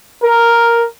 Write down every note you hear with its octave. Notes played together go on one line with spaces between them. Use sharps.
A#4